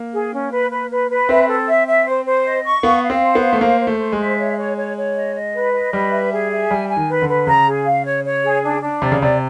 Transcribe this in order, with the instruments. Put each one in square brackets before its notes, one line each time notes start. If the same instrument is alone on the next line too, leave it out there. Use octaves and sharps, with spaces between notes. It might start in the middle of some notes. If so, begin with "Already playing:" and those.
Already playing: [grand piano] A#3
[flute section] G#4
C#4
B4
B4
B4
B4
[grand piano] C4 [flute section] E5
[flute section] A4
E5
E5
C5
C5
D#5
C#6
[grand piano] B3 [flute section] F5
[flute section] F5
[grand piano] C4
[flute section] C5
[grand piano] B3
[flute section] F5
[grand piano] A3
[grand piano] A#3 [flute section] C5
[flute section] C5
[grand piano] A3
[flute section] C5
[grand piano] G#3
[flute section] E5
C#5
C#5
C#5
C#5
D#5
D#5
B4
D#5
[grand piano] G3 [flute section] B4
[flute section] E5
G#4
E5
[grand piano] G3 [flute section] G#5
[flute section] G#5
[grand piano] D#3
[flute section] B4
[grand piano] D3
[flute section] B4
[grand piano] C#3 [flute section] A#5
[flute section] G#4
F5
C#5
C#5
G#4
D4
D4
[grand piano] C3 [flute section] D5
[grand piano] C#3
[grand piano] C3 [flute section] D5